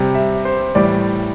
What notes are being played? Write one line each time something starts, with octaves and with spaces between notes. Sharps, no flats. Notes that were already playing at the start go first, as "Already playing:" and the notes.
Already playing: C3 G3
E5
C5
A2 E3 G3 D5